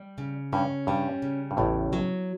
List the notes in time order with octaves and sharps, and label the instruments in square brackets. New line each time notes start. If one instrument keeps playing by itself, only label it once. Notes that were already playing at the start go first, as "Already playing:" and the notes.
Already playing: [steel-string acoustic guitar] G3
C#3
[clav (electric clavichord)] G2 [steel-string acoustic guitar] C#4
[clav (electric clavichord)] G2 [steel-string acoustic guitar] G3
[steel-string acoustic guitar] C#3
[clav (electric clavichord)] G2
[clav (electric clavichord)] A1 A2 [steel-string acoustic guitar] E2
[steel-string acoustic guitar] F#3